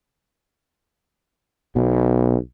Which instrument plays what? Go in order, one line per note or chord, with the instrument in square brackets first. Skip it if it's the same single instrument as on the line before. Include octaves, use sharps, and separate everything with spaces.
[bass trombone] B1 [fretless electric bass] B2